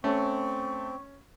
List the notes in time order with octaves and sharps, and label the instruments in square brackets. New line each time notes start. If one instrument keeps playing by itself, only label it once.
[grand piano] A3 [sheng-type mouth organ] C4 [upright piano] C#4 [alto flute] C#6